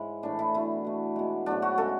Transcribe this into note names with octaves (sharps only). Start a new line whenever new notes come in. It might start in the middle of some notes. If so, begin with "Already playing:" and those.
Already playing: G#2 C#3 G#3 E4
A2 E3 A3 D4
E4
B2 A3 E4
B2 A3
B2 G#3
G#2 F#3 A3 D4
F#4
C#3 G#3 A4